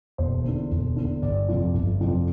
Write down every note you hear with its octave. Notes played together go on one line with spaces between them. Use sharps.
E1 C5
E2 D3
E1
E2 D3
G1 D5
F2 C3 F3
G1
F2 C3 F3